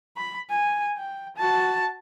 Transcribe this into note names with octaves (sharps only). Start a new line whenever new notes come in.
B5
G#5
G5
F#4 A5